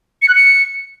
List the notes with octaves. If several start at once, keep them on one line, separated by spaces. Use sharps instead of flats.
C#7
F#6
C#7